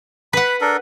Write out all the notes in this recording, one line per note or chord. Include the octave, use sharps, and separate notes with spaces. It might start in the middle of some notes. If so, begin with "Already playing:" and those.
B4 F#5 B5
D4 A4 A#4